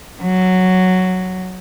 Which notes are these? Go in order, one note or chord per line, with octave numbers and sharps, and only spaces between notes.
F#3